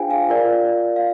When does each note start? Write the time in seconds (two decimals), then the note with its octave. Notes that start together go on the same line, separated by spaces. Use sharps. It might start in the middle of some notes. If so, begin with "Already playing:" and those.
Already playing: D4 F4 G#4 C5 F5 G5 G#5
0.11 F5
0.30 F4 A#4 D5
0.96 F5